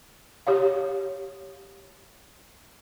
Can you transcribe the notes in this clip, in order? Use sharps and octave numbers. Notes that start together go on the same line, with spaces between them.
G4 C#5 F5